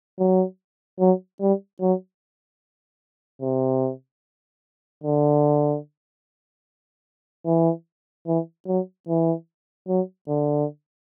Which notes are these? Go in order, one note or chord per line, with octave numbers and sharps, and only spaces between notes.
F#3
F#3
G3
F#3
C3
D3
E3
E3
F#3
E3
F#3
D3